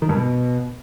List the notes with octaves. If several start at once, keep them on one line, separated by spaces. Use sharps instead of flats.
D#3
G2
B2